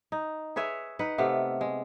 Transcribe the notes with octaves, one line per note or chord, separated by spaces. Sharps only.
D#4
G#4 B4 C#5 E5
D#4 B4 F#5
C3 A3 B3 F5
G#3